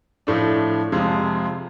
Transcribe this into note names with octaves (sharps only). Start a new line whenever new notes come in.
A2 F3 A3 D4
F2 C3 F3 G#3